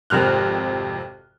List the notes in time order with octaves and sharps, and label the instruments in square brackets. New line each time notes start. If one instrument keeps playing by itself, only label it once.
[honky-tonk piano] G#1 F2 C3 F6 F#6